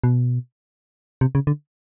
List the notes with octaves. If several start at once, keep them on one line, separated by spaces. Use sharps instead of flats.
B2
C3
C#3
D3